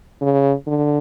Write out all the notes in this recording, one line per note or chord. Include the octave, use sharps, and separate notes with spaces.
C#3
D3